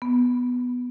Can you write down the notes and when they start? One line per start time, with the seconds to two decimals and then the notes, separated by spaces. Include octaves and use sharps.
0.02 B3